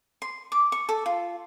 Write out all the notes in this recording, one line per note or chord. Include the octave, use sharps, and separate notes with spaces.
C6
D6
C#6
A4
F4